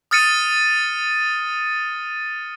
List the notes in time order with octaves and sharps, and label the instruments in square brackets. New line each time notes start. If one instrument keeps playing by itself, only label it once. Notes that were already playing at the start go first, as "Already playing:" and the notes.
[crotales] D#6 F6 A6 C#7 D#7